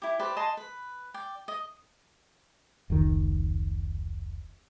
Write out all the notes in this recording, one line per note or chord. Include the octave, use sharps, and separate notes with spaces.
E4 G4
G4 B4 C5 D5
D#5 G#5 A5 C6
B4
D5 G5
D#5
F1 C#2 D#3